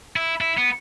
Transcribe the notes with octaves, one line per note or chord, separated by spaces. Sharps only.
E4
E4
B3